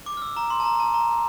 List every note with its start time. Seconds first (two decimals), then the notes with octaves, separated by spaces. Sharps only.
0.06 D6
0.17 F6
0.22 E6
0.37 A#5
0.50 C6
0.60 A5
0.65 A#5
0.75 A#5
0.80 A5
0.94 A#5